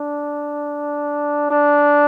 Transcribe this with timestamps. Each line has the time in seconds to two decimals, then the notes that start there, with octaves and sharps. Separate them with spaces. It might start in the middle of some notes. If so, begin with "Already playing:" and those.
Already playing: D4
1.50 D4